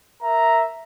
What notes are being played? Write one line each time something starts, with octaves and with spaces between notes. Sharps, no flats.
A#4 E5 A#5